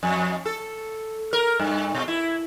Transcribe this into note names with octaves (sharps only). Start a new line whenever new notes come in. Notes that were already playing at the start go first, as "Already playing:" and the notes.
F2
A4
A#4
G2
B2
E4